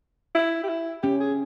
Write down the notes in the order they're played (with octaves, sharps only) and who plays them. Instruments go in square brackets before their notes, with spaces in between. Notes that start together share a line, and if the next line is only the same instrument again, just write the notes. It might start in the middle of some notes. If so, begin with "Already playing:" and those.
[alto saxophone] E4
G4
E4
[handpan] C#4 [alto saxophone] G4
[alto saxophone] G#4